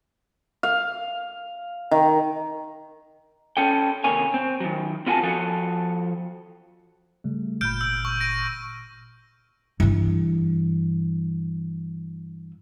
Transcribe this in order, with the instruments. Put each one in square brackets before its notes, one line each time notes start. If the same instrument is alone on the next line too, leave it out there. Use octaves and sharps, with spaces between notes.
[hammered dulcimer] F5
D#3
[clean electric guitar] C#4 A4 G5
D#2 C3 A#3 C#5 G#5
C4
D#3 F#3
C4 F4 F#4 B4 G#5 A5
F3 F#4 A4
[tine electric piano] C#3 G3 A3
[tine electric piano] G1 A#2 B5 [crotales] F6 G6 D7
[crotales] E6
C#6
A#6 D7 D#7
[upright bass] G2 E3